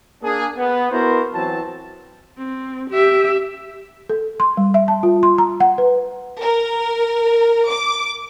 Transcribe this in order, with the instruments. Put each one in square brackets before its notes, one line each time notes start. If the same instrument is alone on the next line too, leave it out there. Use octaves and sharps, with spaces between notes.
[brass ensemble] A#3 D4 G#4
B3
B3 E4 F#4 A#4 C5
E3 F#3 C4 A5
[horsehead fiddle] C4
G4 E5
[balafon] A4
C6
G3
E5
A5
F4
C6
A#5
F#5
B4
[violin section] A#4
D6